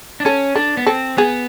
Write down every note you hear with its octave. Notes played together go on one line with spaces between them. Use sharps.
D4
C#4 A4
D4 A4
B3
C4 A4
B3 G#4